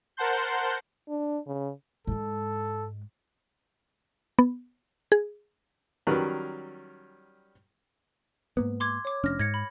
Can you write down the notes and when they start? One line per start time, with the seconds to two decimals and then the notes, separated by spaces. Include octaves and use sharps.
0.17 A#4 C5 F#5 A5 C6 G6
1.09 D4
1.47 C#3
2.07 G#2 G#3 A4
4.39 B3
5.12 G#4
6.07 D#3 F#3 G3 C#4 A#4 B4
8.57 G#2 A#3 B3
8.80 C6 D6 G#6
9.05 C#5 D6
9.24 F1 C#4 D4 F6 A#6
9.39 G#2 G#6 A#6 C#7
9.54 B5